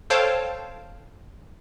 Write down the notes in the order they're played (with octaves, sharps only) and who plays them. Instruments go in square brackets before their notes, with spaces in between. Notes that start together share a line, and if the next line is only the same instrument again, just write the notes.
[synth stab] A4 C5 C#5 F5 G5 A5